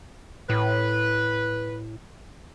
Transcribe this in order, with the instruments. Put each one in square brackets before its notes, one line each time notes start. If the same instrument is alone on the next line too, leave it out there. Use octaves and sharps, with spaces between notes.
[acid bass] A2 [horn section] B4